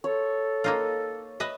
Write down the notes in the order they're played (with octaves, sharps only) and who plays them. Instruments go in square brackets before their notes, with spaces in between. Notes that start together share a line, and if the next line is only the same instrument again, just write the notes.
[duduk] A4 [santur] C#5
[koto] A#3 D#4 F4
B4 D#5 E5